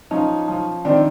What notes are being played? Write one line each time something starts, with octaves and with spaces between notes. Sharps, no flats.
F3 C#4 D#4
F3
D#3 C4 D4